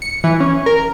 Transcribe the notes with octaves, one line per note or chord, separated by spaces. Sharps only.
C#7
E3
C#4
A#4